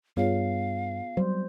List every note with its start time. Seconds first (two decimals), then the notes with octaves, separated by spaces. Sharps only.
0.17 G2 B3 F4 G#4 C#5 F5
1.17 F#3 G3 C5